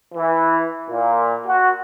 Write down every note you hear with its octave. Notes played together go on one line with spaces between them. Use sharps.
E3
A#2
F#4